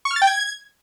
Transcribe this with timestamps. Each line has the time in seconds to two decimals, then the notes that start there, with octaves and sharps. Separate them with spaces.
0.05 C#6
0.11 F6
0.16 A6
0.22 G5
0.27 G#6